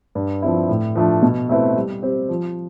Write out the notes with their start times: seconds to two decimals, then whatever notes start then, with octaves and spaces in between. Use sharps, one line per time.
0.15 G2
0.42 F3 C4 E4
0.69 A2
0.95 F3 A3 D4
1.22 B2
1.49 A3 C4 E4 B4
1.76 G3
2.03 C4 G4 C5
2.29 F3